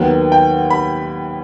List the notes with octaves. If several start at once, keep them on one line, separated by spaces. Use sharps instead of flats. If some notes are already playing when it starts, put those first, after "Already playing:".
Already playing: D#2 D#3 F#3 B3 F#5
G5
B5